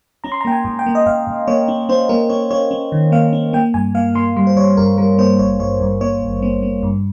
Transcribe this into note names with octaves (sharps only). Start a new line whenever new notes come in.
C#4 A#5
C6
A#5
A#3 G5
G#5
G#2
G5
A#3
D#5
G#2 F5
G#2
A#3 C#5
C#4
C#4 C5
A#3 A#4
C#4 C#5
C#4 C#5
C#4
D#3
A#3 F5
C#4
A#3 G5
G2 G#5
A#3 F5
A#3 C6
G3 C6
C5
G3 C#5
G2 A#4
G3 A#4
A#3 C5
G#1 C#5
G2 C#5
G2
A#3 C#5
G#1
A#3
A#3
G2